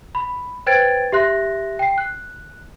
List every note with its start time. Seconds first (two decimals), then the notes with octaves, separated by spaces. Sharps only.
0.15 B5
0.67 B4 C5 G5 G#6 A6 D7
1.12 G4 E5 C6 F#6 A#6
1.79 G5 C7
1.98 F#6